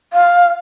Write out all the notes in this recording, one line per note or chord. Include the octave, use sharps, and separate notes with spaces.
F5